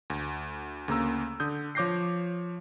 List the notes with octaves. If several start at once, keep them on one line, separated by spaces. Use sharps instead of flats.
D2
D2 C#3 A#3 A#5 E6
D3 D#6 G6
F3 C#5 D6 G6 A#6 C7